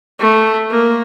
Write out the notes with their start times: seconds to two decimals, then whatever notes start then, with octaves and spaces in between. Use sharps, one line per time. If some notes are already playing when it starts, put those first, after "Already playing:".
0.19 A3
0.70 A#3